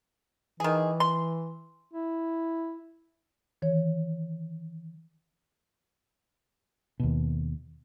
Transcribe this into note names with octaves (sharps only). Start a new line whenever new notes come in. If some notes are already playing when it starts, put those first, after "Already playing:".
D#3 E3 G#4
C6
E4
D#3 E3 C#5
D#2 B2